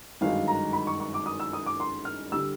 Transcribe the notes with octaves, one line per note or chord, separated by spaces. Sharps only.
G1 F#2 D#3 G#3 F5
A#5
B5
C#6
C#6
D6
D#6
E6
D#6
D6
C6
F6
D3 G3 E6